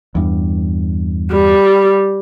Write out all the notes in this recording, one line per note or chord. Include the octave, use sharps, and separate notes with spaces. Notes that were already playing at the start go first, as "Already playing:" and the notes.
E2 G2
G3